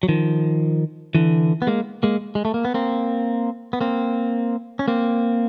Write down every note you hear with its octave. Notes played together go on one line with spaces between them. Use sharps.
F#3
D#3 F3
D3 E3
B3
G#3 A#3
G#3 A#3
G#3
A3
A#3
B3
A#3 C4
B3
A#3 C4
C#4
A#3 C4